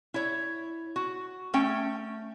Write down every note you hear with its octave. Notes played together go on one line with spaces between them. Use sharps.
E4 C#5
F#4
A3 C#4 G5